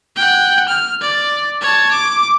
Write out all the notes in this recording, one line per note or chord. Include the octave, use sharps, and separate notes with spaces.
F#5 G5
F6
D5
C#5 A5
D6